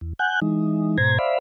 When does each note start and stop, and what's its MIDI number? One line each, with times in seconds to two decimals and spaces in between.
0.01 0.13 40
0.19 0.40 78
0.19 0.40 80
0.19 0.40 90
0.19 0.40 91
0.42 0.98 52
0.42 0.98 56
0.42 0.98 63
0.98 1.18 44
0.98 1.18 47
0.98 1.18 72
0.98 1.18 82
0.98 1.18 92
1.19 1.38 72
1.19 1.38 74
1.19 1.38 76
1.19 1.38 77
1.19 1.38 83